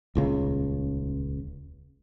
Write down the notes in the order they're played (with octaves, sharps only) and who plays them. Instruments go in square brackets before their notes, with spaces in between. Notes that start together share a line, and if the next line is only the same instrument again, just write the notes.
[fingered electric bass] D#1 C#2 C#3